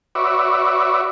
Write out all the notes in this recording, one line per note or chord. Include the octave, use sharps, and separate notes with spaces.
F#4 B4 C#5 D5 E5